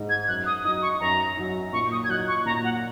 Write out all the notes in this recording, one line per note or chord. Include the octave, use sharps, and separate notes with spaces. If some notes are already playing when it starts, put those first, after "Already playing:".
Already playing: G#2 G#3 D#4
G#6
F#2 F#6
D#6
F#3 D#4 D#6
C#6
F#2 A#5
F#3 D#4
A#2 C#6
D#6
G#6
F#3 D#4 F#6
C#6
A#2 A#5
F#5